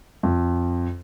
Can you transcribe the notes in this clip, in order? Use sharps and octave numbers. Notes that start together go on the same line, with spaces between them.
F2